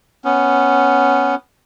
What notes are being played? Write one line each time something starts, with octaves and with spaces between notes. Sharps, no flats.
B3 C#4